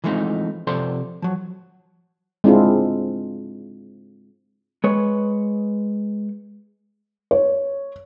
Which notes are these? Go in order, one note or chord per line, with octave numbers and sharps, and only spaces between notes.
E3 F3 G#3 A3 C4 D#4
C3 F3 A4 C5 D5 C6
F3 F#3
G#3 C4 D4 E4 F4
G#3 B4 C#5
C#5